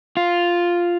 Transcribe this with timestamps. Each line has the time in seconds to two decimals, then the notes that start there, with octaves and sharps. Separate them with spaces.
0.17 F4